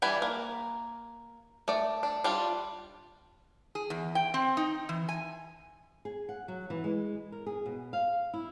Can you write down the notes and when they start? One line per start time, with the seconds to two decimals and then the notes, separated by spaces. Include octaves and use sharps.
0.02 E3 G3 D4 G#5 B5
0.22 A#3
1.68 A3 D5
2.03 D4
2.24 G3 D4 F4
3.75 G#4
3.90 E2
4.15 G5
4.34 C4
4.57 D#4
4.89 E3
5.09 G#5
6.05 G#4
6.29 F#5
6.48 F#3
6.70 E3
6.84 G#3
7.32 A#4
7.46 G#4
7.66 B2
7.93 F5
8.33 E4